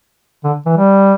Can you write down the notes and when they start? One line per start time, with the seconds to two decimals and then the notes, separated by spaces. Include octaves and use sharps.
0.44 D3
0.66 E3
0.77 G3